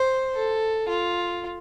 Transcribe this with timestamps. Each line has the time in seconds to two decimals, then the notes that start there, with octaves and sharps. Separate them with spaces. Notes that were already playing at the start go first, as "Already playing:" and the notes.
Already playing: C5
0.34 A4
0.89 F4